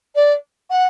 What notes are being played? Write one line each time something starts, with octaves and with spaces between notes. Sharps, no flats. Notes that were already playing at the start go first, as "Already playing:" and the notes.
D5
F#5